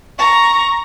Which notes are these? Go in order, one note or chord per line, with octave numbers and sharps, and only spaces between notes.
A#5 C#6